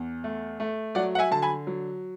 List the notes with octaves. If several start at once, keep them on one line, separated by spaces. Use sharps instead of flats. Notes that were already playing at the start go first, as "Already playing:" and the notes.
Already playing: E2
A3
A3
F#3 D5 F#5
F#5
E5 G#5
D3 A5
G#5 B5
F#3